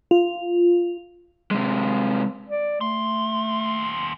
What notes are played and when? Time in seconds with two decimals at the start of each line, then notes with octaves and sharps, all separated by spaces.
0.11 F4
1.51 C3 G#3
2.49 D5
2.81 D#2 A3 C6